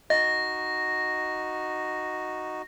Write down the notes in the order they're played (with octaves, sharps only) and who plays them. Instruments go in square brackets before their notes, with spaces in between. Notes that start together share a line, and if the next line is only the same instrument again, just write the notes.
[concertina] D#4 F#4 [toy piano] D#5 [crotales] A#6